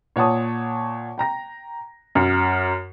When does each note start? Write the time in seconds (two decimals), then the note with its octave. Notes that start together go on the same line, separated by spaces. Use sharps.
0.16 A#2 C#5 F#5 A5 D#6
1.18 G5 A#5 A#6
2.15 F#2